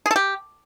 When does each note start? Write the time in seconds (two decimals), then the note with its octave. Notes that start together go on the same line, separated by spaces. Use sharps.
0.06 G#4
0.11 A4
0.16 G4